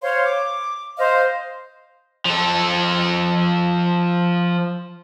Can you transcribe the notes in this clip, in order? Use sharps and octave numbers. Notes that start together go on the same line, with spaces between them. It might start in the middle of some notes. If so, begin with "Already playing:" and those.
C5 C#5 F5 C6
D6
C5 D#5 F5
F3 A4